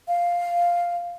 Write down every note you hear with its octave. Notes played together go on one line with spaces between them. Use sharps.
F5